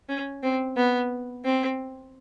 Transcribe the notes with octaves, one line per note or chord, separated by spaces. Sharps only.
C#4
C4
B3
C4